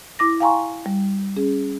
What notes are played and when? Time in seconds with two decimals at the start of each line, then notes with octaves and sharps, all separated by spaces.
0.19 E4 D6 A#6
0.40 F5 G5 G#5 A#5 C6 C#6
0.86 G3
1.36 C#4 G#4